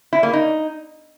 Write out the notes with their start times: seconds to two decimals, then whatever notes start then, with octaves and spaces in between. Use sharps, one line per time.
0.13 E4
0.23 A#3
0.33 D#4